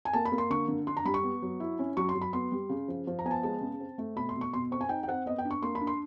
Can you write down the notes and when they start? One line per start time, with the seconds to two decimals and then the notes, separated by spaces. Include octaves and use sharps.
0.05 G#5
0.13 A#3 A5
0.25 B5
0.32 A#3
0.38 C6
0.50 D3 C#6
0.68 D3
0.87 D4 C6
0.97 A#5
1.05 G3 B5
1.14 C#6
1.23 B3
1.42 F#3
1.60 E4
1.79 C#4
1.97 F#3 C#6
2.09 C6
2.15 F#3
2.21 B5
2.33 B3 C6
2.52 G3
2.69 C#3
2.88 F3
3.07 F3
3.19 A#5
3.24 B3 G#5
3.31 A5
3.43 G#3 A5
3.61 C#3
3.80 C4
3.98 A3
4.16 B2 B5
4.29 C6
4.35 B2
4.41 C#6
4.53 B2 C6
4.71 C4 C#6
4.81 G#5
4.89 D#4 G5
5.03 G5
5.08 C4 F#5
5.26 B3 D#5
5.38 G5
5.45 D4
5.51 C#6
5.63 A#3 C6
5.75 B5
5.81 D4
5.87 C6